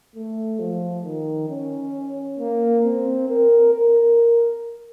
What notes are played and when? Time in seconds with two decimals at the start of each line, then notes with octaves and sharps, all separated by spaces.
0.15 A3
0.59 F3
1.04 D#3
1.49 C#4
2.39 A#3
2.84 C4
3.29 A#4
3.73 A#4